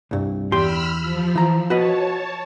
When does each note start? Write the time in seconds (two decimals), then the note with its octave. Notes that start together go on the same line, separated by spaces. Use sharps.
0.11 C2 G2
0.52 E2 G4 B5 C6 E6 F6
1.02 F3
1.35 E3 A#5
1.70 F#4 B4 C#5 D#5 A5